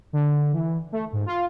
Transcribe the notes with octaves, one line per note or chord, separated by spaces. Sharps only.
D3
E3
A3
G#2
F4